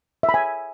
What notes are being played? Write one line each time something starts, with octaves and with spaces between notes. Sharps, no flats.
E5
B5
G#5